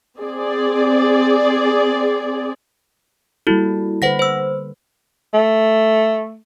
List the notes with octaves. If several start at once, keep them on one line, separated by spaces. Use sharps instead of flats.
C4 G#4 D5
G3 A#3 E4 F#4 A4
D3 B4 C5 F#5 A#6
C5 E6
A3